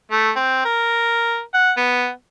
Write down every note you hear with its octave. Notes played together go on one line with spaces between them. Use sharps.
A3
C4
A#4
F#5
B3